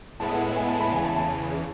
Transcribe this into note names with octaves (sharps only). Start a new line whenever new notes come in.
A2 G#3 B3 E4 A5
F#5
F#5
G#5
A5
B5
E2 C#3 E3 G#5
A5
A5